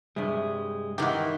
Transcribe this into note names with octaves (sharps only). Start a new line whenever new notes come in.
G2 C3 G#3
D#3 E3 D#4 E4 G4 F#5